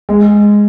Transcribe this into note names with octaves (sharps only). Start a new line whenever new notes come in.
G#3